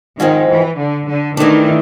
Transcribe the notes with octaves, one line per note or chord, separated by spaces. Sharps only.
G#2 D#3 F3 G#3 C4
E3
D3
D3
D#3 E3 A3 D4